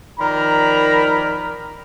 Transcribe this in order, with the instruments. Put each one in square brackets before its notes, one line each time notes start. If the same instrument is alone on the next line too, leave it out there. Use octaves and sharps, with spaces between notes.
[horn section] D#3 F3 A#4 D5 A#5 B5